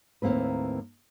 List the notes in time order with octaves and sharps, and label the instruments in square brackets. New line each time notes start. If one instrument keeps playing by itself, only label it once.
[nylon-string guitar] D#2 A2 F3 A#3 C4 B4